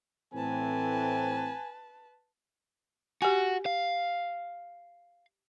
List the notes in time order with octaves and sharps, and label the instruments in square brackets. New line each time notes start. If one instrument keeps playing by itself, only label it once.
[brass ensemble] A2 E3 C4 [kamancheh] B4 A5 [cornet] G#5
[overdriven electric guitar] F#4 [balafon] G4 G#5
[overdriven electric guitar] F5